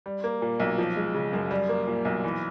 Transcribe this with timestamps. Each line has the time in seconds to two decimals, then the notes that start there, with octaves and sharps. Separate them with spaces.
0.06 G3
0.24 A#3
0.42 A#2
0.60 B1
0.78 F3
0.97 G#3
1.14 C#3
1.33 F#2
1.51 G3
1.69 A#3
1.87 A#2
2.05 B1
2.24 E3